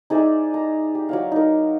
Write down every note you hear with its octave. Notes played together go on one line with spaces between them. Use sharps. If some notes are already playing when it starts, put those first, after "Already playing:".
D#4 G#4 D5 E5
A#5
G4
F#3 D5 F5
D#4 A#4